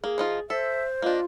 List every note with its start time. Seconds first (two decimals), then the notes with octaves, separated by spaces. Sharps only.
0.04 A#3 G#4
0.18 F3 D#4 F4
0.50 A4 C5 E5
1.02 A#3 D4 F4 D#5